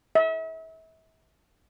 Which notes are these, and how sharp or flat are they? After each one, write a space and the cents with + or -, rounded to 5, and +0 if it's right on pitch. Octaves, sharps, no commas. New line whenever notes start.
E5 -35